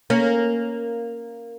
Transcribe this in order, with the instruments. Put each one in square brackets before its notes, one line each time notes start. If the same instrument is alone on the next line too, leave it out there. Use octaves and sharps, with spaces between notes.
[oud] A#3 C#4